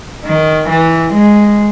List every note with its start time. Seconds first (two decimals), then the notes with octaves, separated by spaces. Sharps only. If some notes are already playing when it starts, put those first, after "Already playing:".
0.25 D#3
0.69 E3
1.13 G#3